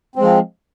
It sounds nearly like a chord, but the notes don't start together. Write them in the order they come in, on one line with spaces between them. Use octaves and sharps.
C4 G#3 F3